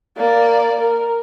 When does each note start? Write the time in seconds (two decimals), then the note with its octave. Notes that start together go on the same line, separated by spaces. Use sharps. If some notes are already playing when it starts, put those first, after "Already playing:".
0.17 A#3 D5
0.80 A#4